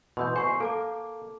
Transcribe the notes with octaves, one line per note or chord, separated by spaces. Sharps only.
B2 E3 C6 E6 G6
C5 G#5 C#6 C7
A#3 A4 A5 D6